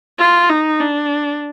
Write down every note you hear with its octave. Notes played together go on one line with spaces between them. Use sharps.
F4
D#4
D4